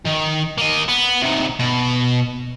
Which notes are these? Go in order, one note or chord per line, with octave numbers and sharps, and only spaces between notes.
D#3
A#3 D#5
B3
C3 D#3
B2